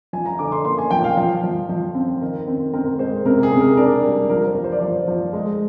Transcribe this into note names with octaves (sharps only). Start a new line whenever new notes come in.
F3 G#5
A#5
D3 D6
C6
A#3 C6
G#5
F3 G5
F5
F3
F3
F3
C4
D#3 A#4
C4
C4 A#4
G#3 C5
C3 A#4
G#4
C3
A#4
D4 A#4
G3
F3 A#4
C5
F3
C5
D5
F3 C5
F3
G#3